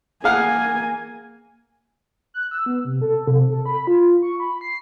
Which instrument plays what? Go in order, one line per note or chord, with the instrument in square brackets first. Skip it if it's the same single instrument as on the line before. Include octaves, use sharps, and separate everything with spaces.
[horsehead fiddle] A#3 G#5 [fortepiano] G#4 F5 F#5
[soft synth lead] F#6
E6
B3
C3
A4
C3
A4
B5
F4
C#6
B5
C7